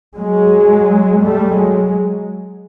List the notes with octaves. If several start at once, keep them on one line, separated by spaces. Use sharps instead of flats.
F#3 G#3
G3 A3
F#3 G#3